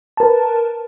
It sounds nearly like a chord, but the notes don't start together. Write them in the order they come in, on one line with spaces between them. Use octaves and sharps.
A5 A#4 B4